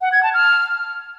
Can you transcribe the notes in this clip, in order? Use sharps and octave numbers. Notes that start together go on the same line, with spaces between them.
F#5
G#6
A5
F6